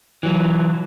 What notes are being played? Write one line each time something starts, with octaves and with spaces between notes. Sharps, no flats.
E3 F#3